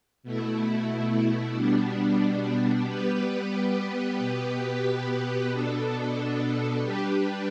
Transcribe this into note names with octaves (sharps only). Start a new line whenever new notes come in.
B2 A3 E4
B2 G3 B3 D4
G3 B3 G4 B4
B2 B3 G4 B4
B2 B3 D4 A4
G3 D4 G4 B4